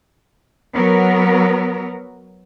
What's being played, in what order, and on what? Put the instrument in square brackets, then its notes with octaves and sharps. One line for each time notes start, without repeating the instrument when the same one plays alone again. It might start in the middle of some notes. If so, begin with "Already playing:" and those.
[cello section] F#3 B3 A#4